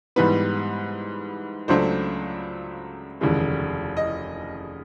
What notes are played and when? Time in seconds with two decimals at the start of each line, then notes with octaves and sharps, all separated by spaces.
0.16 G#2 E3 G3 B3 B4
1.68 C#2 C#3 F#3 A3 D4 C5
3.21 F1 D#2 C#3 E3 G#3
3.97 D#5